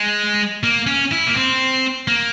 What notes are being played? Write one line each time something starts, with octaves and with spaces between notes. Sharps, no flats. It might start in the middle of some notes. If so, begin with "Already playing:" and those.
Already playing: G#3
A#3
C#4
E4
A#3
C4
A#3